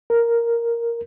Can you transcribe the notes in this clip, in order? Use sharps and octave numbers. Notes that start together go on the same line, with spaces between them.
A#4